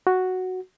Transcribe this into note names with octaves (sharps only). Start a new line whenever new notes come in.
F#4